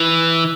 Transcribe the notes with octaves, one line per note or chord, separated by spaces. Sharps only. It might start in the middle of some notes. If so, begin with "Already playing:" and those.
Already playing: E3